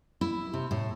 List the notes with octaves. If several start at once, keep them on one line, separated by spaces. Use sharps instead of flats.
E4
C3
A2